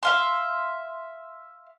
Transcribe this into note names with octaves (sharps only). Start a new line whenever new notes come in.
E5 F5 C6